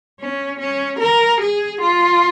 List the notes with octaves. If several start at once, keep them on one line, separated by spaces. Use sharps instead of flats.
C#4
C#4
A#4
G#4
F4